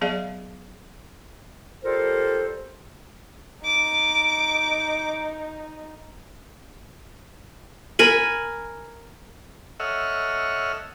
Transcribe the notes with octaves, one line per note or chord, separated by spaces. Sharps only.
F#3 B3 G#4 D5 D#5 F5
G3 F4 A4 A#4 C5
D#4 D6
A#4 G#5 B5
A4 C#5 D#5 E5 F#5 F6